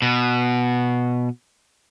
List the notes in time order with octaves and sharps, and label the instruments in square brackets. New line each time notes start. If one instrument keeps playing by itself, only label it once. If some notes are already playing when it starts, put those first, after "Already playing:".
[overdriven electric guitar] B2